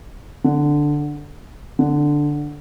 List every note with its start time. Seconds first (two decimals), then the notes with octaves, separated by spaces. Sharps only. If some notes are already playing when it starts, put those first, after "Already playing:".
0.44 D3
1.79 D3